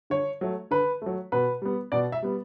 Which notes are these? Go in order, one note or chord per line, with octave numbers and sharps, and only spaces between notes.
D3 C#5
F#3 A3
D3 B4
F#3 A3
B2 B4
G3 B3
B2 D5
E5
G3 B3